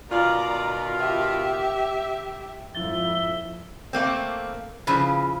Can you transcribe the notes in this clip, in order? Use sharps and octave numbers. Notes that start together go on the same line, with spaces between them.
B2 D#3 F4 D5 A#5
G4 E5
F2 G#2 E4 E5 A6 G7
A3 A#3 C4
C#3 F3 E4 B4